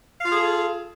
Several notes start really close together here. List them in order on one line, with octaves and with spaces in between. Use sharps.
F5 F4 G#4 A4